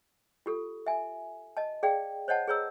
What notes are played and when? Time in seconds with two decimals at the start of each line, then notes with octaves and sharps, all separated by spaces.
0.46 F4 G4 A4
0.87 E5 G#5
1.57 D#5 A5
1.83 G#4 D5 F5 G5
2.28 C5 C#5 D#5 F#5 A5
2.48 G#4 B4 C#5 A#5 E6